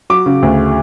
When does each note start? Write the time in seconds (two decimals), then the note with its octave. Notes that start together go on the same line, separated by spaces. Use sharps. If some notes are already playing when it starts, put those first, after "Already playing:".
0.10 F#3 D6
0.26 C#3
0.42 D2